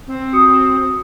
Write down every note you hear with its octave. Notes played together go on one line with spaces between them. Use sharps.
C4
F#4 D#6 C#7